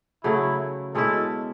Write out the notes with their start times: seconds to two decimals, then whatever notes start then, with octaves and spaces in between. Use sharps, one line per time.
0.23 C#3 F#3 A3 E4
0.94 B2 G#3 C#4 E4 A4